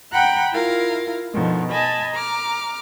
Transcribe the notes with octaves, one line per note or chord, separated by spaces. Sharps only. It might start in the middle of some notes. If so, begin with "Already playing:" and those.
F#5 G5 A#5 B5 F#6
E4 F4 A#4 F5
B2 D3 D#3 F3
D#5 G#5 A5 B5
A#5 D6 F6